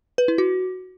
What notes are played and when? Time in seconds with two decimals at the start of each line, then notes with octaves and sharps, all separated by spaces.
0.18 B4
0.28 E4
0.38 F#4